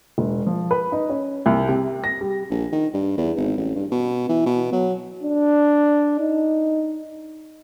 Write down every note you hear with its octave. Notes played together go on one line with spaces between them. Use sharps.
E1
F3
B4
D#4
C#4
C2
C3
A#6
G3
A#1
D#3
G2
E2
G#1
A1
G2
B2
E3
B2
F#3
D4
D#4